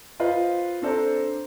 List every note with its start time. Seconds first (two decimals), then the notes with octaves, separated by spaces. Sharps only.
0.20 F4 B4 C5 D#5 F5
0.82 C4 D4 A4 C5 D5 A#5